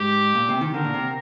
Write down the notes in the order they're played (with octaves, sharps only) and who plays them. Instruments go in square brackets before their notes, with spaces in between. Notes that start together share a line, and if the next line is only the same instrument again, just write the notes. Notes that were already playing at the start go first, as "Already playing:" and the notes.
Already playing: [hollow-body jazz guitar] G#2 [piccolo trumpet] G4
[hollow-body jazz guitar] A#2
C3
D#3
[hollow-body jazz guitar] D3 [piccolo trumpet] A#4
[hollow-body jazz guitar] A#2
C3